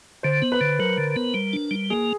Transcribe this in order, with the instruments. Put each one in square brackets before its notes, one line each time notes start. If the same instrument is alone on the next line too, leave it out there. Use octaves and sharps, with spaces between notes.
[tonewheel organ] D3 [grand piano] C5
[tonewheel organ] B3
[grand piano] B4
[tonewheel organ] D3
[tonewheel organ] F#3 [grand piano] A#4
[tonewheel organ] D3
B3
G3
D4
G3
[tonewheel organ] A#3 [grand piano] G#4